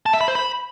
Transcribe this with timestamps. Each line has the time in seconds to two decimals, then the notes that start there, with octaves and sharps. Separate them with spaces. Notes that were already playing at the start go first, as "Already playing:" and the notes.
0.06 A5
0.13 E5
0.21 B5
0.28 C5
0.35 B5